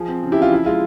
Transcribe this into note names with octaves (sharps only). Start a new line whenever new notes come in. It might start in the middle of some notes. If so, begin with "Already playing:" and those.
Already playing: F3 G#4
C4
C#3
E4 G4
C#3 F4
F3 E4
G#3 F4